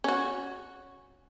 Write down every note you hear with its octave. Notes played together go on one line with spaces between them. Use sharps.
C#4 F#4